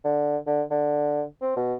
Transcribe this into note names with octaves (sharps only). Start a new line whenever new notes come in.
D3
D3
D3
C4
B2